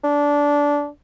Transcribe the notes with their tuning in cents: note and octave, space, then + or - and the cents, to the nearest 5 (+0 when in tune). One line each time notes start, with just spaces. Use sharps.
D4 -15